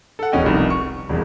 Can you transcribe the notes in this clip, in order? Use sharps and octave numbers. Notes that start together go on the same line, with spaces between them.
A4 F#5
E1 B2 C#4 D#5 G5
F1 C2 D#4
C#6
E1 C2